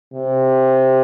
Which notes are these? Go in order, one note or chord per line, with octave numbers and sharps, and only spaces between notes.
C3